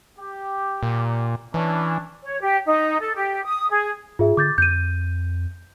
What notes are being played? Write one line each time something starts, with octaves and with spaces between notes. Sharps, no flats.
G4
A#2
E3 C#4 D4
C#5
G4
D#4
A4
G4
D#6
G#4
G#2 F4 G#4 E5
D3 D6 G6 A6
F2 G6 D#7